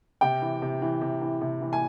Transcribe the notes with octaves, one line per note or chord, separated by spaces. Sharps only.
C3 G5
E3
C3
E3
C3
E3
C3
E3
G#5